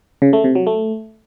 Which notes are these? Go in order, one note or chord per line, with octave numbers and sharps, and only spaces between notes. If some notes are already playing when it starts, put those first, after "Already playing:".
C#3
A3
C3
F#3
A3